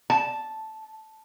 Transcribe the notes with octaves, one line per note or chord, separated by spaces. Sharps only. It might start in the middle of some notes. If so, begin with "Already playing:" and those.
A5